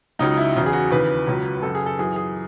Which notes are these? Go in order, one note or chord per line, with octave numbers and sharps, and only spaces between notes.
C#2 C#3 F#3 D#4
E4
E2 C#3 F#3
G#4
F#4
D#2 C#3 E3 B4
C#2 C#3 F#3
F#2 C#3 F#3 A4
G#4
A4
F#2 E3 G#4
G#4